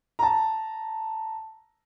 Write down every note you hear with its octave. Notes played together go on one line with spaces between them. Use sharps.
A5 A#5